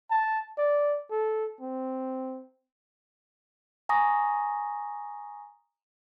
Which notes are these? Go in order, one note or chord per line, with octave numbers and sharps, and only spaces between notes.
A5
D5
A4
C4
G#5 A#5 C#6 D#6 A#6